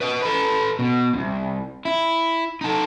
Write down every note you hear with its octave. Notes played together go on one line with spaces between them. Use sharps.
B4 D#5
A4 B4
B2
C2 F2
E4
D#4 A4